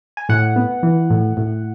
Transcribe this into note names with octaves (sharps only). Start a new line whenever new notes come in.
G#5
A2 F#5
B3
E3
A2
A2